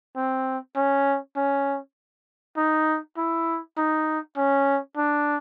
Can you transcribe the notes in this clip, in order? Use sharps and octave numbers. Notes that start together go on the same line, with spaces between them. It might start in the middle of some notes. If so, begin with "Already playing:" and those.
C4
C#4
C#4
D#4
E4
D#4
C#4
D4